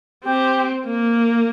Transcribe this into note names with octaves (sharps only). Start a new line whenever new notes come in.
C4 G4
A#3